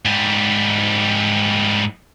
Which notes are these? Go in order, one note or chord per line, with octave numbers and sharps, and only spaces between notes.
G#2 G3